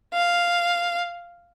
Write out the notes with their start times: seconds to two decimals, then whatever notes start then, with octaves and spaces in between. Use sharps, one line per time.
0.13 F5